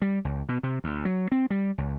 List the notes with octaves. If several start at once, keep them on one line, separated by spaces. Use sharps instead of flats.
G3
C#2
B2
C3
D2
F#3
C4
G3
C#2